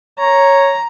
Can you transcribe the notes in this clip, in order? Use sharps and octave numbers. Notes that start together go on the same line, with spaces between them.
C#5 A#5